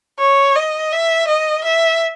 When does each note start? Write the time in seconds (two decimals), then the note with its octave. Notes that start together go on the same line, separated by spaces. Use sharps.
0.19 C#5
0.56 D#5
0.92 E5
1.28 D#5
1.64 E5